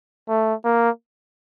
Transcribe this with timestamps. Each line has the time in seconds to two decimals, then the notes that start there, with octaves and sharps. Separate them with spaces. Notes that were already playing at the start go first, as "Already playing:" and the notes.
0.29 A3
0.64 A#3